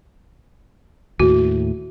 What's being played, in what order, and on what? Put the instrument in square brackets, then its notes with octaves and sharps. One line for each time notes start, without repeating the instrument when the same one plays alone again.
[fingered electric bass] D#2 A2 [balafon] F#4